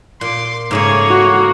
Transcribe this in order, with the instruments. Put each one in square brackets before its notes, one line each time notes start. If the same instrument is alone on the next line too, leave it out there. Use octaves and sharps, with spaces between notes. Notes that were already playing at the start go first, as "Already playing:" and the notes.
[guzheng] A#2 [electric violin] C6 D6
[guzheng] G#2 C#3 A3 [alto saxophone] A#3 [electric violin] G#4 C#5
[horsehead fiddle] F#4